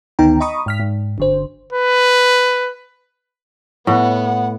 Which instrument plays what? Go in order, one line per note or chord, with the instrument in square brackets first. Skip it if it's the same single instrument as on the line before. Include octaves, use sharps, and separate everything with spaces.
[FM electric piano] D2 D#3 B3 D#4 G5 A#5
D#5 A#5 B5 C#6 D#6
G#2 F6 B6
G#2
G1 D3 C5
[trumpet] B4
[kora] A2 [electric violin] B3 [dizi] F#5